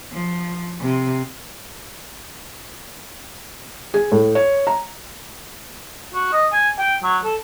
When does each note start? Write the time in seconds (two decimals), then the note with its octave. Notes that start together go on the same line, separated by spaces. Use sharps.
0.12 F3
0.81 C3
3.94 G#4
4.12 A2
4.35 C#5
4.67 A#5
6.14 F#4
6.33 D#5
6.52 G#5
6.78 G5
7.03 F#3
7.25 A4